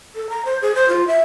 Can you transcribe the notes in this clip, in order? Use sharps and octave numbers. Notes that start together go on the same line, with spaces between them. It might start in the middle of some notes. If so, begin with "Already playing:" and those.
A4
A#5
C5
G#4
C5
F4
E5